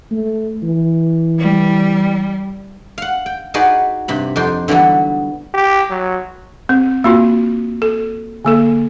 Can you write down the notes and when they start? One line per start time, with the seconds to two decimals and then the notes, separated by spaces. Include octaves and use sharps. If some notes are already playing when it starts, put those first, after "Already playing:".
0.11 A3
0.63 E3
1.38 G3
2.98 F5 F#5
3.26 G5
3.54 D#4 F#4 G#4 B4 D5
4.08 G2 C3 B5
4.36 F2 D4 D#4 G5 C6
4.68 D3 E3 F#3 G3 B3
5.54 G4
5.90 F#3
6.69 C4
7.04 A#3 F4 F#4
7.82 A4
8.45 D3 A#3 A4